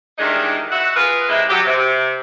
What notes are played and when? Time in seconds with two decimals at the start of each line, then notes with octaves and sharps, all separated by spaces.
0.18 D#3 E3 G3 G#3 D4 D#4
0.70 F#4 B4 E5 F#5
0.95 F4 G#4 A#4 B4
1.29 C3 G#3 E4
1.49 F#3 G4
1.66 C3